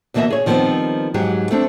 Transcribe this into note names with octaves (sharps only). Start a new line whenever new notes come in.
D2 B2 E3 A#3 D#5 E5
G#4 C#5
D#3 F3 G3 A3 B3 C4
G#2 F#3 G4 G#4
A3 C4 D4